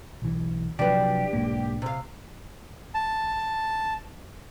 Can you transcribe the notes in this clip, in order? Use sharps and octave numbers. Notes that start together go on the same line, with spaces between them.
B1 E3
C3 F3 F#3 D4 G4 B4
B1 G#2 A#3
C3 F5
A5